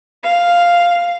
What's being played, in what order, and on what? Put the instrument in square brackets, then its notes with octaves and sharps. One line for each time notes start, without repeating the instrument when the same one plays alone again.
[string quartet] F5